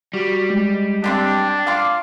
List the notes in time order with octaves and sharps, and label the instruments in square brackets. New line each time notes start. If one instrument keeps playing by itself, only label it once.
[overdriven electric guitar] G3 [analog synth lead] F#4
[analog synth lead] G#3
[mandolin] C4 F4 G4 [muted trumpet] D4
[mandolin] F4 F5 [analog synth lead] D6